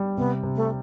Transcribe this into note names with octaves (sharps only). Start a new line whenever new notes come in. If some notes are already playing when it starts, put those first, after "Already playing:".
Already playing: G3
C3 B3
C3
A3